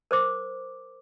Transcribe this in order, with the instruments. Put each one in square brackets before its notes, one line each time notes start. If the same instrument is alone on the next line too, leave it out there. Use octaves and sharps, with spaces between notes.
[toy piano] A#4 C5 D6